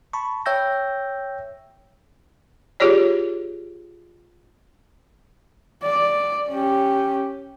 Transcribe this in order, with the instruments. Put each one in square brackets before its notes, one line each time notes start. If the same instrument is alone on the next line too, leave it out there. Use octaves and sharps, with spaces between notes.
[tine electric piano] A5 B5 C#6
C#5 E5 G5 E6 G6 A#6
[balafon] F4 G4 G#4 C#5 D5
[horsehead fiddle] D5
C#4 G4